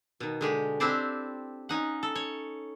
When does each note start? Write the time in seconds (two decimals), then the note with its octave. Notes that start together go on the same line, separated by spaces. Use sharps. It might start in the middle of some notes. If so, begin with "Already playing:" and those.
0.20 B2 D#3
0.41 D3 G#3 G4
0.80 C4 D4 E4 G4 C5 D5
1.69 C#4 D#4 F#5
2.03 A4
2.15 C#5